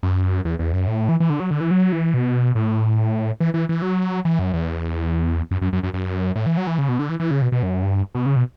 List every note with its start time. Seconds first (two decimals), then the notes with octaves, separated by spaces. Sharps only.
0.03 F#2
0.45 E2
0.59 E2
0.73 F#2
0.87 A2
1.09 E3
1.20 E3
1.30 D3
1.40 F#3
1.51 D3
1.61 E3
1.71 F#3
1.92 E3
2.14 B2
2.55 A2
3.40 E3
3.54 E3
3.69 E3
3.82 F#3
4.25 E3
4.39 F#2
4.53 E2
5.51 F#2
5.62 F#2
5.73 F#2
5.83 F#2
5.94 F#2
6.36 A2
6.46 E3
6.57 F#3
6.67 E3
6.78 C#3
6.89 B2
6.99 D3
7.09 E3
7.20 E3
7.31 C#3
7.42 B2
7.52 B2
7.63 F#2
7.83 G2
8.15 B2
8.26 C#3
8.36 B2